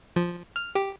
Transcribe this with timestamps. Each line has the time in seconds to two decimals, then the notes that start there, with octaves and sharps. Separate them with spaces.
0.16 F3
0.56 F6
0.75 G4